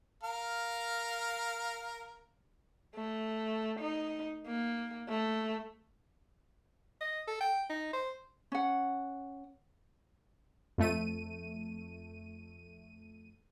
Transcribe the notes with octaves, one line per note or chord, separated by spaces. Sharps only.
A#4 F5
A3
D#4
A#3
A3
D#5
A4
G5
D#4
C5
C#4 F#5
F2 A3 D#7